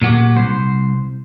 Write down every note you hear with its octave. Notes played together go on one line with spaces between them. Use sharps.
A#2 F#3 F#4 G4
C2 C5